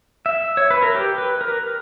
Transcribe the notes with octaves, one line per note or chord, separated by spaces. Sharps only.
E5
C#5
B4
A#4
G4
B4
A#4